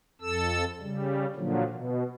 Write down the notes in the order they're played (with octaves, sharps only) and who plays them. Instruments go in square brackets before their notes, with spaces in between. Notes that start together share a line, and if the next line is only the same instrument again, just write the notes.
[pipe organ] F2 A4 E6
C#3 G3
A#2 D3 F3 F#3
B2